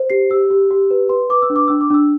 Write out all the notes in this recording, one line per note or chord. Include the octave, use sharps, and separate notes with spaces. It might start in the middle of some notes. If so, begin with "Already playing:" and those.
Already playing: C5
G4 C7
G4 E6
G4
G4
B4
B4 C6
B4 D6
E6
D4
D6
D4 E6
D6
D4 E6